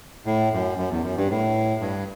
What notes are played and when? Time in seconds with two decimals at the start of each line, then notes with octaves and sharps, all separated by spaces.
0.26 A2
0.53 F#2
0.78 F#2
0.91 E2
1.04 F#2
1.17 G2
1.30 A2
1.81 G2